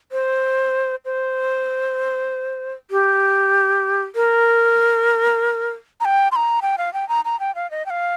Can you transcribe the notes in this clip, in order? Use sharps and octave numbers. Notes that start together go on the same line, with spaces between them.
C5
C5
G4
A#4
A#5
G5
C6
A#5
G5
F5
G5
A#5
A#5
G5
F5
D#5
G5
F5